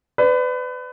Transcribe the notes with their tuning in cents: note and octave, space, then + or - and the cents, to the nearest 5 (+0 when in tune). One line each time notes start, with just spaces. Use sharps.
B4 +30 D5 +0